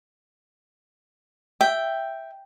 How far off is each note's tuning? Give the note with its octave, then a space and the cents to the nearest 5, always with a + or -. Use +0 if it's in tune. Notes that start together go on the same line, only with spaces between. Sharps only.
E5 +0 G5 +0